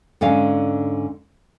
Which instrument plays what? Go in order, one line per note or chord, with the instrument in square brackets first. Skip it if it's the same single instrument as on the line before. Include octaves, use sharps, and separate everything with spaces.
[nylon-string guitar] G#2 D3 C#4 F5